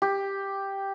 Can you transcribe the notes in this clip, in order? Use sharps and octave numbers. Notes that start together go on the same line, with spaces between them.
G4